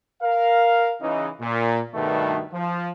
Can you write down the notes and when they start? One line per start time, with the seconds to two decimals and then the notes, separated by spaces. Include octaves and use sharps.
0.23 A#4 F5
1.01 C#3 E3 D#4
1.41 A#2
1.95 G2 B2 D#3 A3
2.53 F3